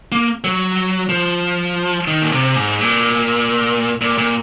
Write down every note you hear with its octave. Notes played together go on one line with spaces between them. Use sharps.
A#3
F#3
F3
D#3
A#2
C3
G#2
A#2
A#2
A#2